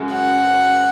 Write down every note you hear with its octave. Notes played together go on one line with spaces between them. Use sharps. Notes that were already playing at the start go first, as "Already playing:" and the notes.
Already playing: F#2 C#3 G#3 F#4
F#5